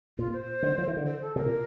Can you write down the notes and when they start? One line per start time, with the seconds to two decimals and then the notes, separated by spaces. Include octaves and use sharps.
0.18 A#2 F4
0.33 C5
0.63 D3
0.78 F3
0.87 E3
0.97 D3
1.07 C5
1.21 A4
1.36 C3 A#4
1.46 A#2